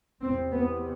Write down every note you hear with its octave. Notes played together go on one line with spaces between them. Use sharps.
E2 C3 C4
B3